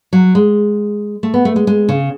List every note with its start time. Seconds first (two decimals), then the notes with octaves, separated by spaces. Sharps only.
0.13 F#3
0.35 G#3
1.23 A3
1.34 B3
1.45 A3
1.56 G#3
1.67 G#3
1.89 C#3